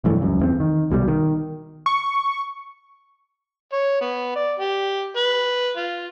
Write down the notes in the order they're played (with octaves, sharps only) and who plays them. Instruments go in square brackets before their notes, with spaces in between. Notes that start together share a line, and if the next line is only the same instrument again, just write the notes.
[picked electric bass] F1 G2 E3 A3
C#2 F#2
E2 A#3 C4
D#3
C2 B2 D3 G3
D#3
[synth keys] C#6
[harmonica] C#5
B3
D5
G4
B4
F4